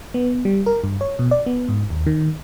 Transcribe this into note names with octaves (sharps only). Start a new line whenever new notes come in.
B3
G3
A#4
G2
C#5
B2
D5
B3
G#2
D#2
D#3